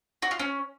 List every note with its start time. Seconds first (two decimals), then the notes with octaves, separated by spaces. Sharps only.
0.22 F#4
0.31 F4
0.40 C#4